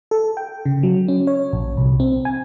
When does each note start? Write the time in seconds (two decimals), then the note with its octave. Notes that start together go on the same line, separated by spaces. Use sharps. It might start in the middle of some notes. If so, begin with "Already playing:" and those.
0.11 A4
0.37 G5
0.66 C#3
0.83 F#3
1.08 C#4
1.27 C#5
1.53 A#1
1.77 C2
2.00 C4
2.25 G#5